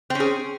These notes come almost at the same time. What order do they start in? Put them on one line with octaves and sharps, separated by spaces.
C4 C#4 G#4